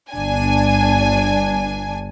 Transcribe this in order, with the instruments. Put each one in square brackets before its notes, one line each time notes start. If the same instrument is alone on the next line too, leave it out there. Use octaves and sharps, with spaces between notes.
[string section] G1 D4 G#5